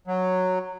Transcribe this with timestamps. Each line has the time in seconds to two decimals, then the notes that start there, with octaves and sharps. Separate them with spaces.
0.07 F#3